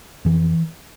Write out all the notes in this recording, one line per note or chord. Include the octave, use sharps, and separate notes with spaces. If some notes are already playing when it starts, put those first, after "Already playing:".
F2 E3